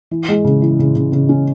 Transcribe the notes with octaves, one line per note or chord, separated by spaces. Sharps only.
E3
G#3
C#3
E3
C#3
C#3
C#3
C#4